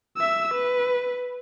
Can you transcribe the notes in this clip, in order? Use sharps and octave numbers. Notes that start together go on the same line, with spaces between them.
E5 E6
B4